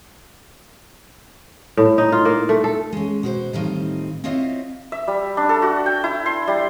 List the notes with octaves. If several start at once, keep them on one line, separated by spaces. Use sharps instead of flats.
A2
D#4
F4
A#3
A3
A4
G#3 C#4
B2 F#4 C5
A2 D#3 G3 C4 D#4 F4
C4 E4 F4 C#5 D#5 F5
E5
G3
D4
A4
F#4
G5
E4
C6
G3